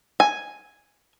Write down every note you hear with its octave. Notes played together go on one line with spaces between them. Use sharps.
G#5